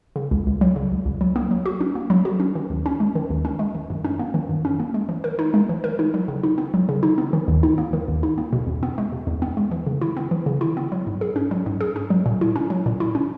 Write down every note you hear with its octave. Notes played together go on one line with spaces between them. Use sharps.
C#3
C#2
C#2
F#3
C#3
C#2
C#2
F#3
A#3
F#3
F#4
C#4
A#3
F#3
F#4
C#4
D#3
D#2
C#4
G#3
D#3
D#2
C#4
G#3
D#3
F#2
C#4
A#3
D#3
F#2
C#4
A#3
G#3
E3
A#4
D#4
G#3
E3
A#4
D#4
F#3
C#3
D#4
B3
F#3
C#3
D#4
B3
D#3
D#2
D#4
A#3
D#3
D#2
D#4
A#3
B2
E2
B3
G#3
B2
E2
B3
G#3
E3
C#3
E4
B3
E3
C#3
E4
B3
F#3
G#2
G#4
C#4
F#3
G#2
G#4
C#4
F#3
A#2
E4
C#4
F#3
A#2
E4
C#4